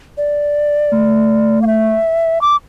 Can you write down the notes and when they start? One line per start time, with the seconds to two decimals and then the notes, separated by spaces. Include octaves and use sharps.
0.18 D5
0.93 A3
1.62 F5
1.67 E5
2.41 D6